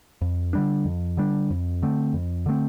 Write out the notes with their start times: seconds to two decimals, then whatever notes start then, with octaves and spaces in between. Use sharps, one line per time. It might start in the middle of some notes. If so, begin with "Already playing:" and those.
0.22 F2
0.53 D3 G3 D4
0.85 F2
1.17 D3 G3 D4
1.50 F2
1.83 D3 A3 C4
2.14 F2
2.46 D3 A3 C4